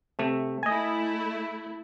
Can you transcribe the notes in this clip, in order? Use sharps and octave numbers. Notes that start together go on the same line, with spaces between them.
C3 A3
A3 E4 D#5 G#5